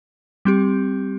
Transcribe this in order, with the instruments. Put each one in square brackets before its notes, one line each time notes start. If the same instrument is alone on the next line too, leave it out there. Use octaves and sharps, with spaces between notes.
[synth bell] G3 C4 G4